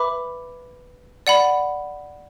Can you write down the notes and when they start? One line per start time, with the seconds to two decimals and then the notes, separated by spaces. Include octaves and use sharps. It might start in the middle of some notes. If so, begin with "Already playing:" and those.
Already playing: B4 E5 B5 D6
1.27 D5 F#5 B5